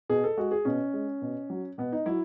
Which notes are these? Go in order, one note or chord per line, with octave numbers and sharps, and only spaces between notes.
B2 G#4
A4
G#3 F#4
G#4
B2 C#4
G#3
B2
F#3
B2 B3
D#4
F#3 E4